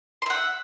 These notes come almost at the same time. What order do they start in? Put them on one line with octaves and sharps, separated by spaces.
C6 E5 F#5